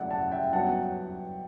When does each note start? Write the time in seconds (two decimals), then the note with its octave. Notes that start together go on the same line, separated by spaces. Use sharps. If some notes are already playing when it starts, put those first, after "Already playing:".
Already playing: F#2 C#3 F#3 A3 E4 D5 F#5
0.11 F#5 A5
0.32 E5 G5
0.53 G2 F#3 B3 F#4 C#5 F#5 A5